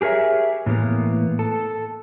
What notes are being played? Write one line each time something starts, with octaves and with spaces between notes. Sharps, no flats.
G4 G#4 A#4 C#5 E5
A2 E3 A#3 B3
A4